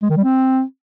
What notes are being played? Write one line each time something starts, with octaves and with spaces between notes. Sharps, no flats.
G#3
D#3
G3
C4